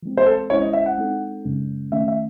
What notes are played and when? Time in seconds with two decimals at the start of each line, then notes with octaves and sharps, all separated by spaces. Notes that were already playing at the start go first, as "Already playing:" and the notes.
0.02 E3 G#3 C4
0.17 C5
0.26 A4
0.50 G#3 C#4 E4 C5 C#5
0.62 D#5
0.73 E5
0.86 F#5
0.98 G#3 C4 D#4 A4
1.45 F#2 C#3 G#3 C#4
1.92 D#3 A3 C#4 E5
2.08 E5